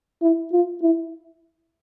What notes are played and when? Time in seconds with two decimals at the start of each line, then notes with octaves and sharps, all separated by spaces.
0.22 E4
0.52 F4
0.82 E4